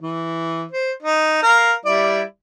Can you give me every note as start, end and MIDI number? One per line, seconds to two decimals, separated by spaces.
0.02 0.64 52
0.71 0.92 72
1.03 1.40 63
1.43 1.74 70
1.43 1.74 77
1.86 2.22 55
1.86 2.22 64
1.86 2.22 74